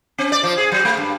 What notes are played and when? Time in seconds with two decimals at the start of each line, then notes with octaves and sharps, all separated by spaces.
0.18 C4
0.32 D5
0.43 F3
0.58 G#4
0.72 F#3
0.85 A3
0.97 G2